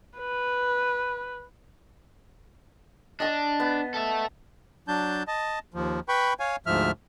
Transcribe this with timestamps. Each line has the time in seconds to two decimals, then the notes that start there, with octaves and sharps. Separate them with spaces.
0.19 B4
3.20 D4 D#5 A5 D#6
3.60 B3
3.94 A4 E5
4.88 F#3 D4 A5 G6
5.28 D#5 A5
5.74 D#2 F3
6.09 B4 G5 B5 C#6
6.40 C#5 F5 G#5
6.66 D2 G#2 F3 E5 F6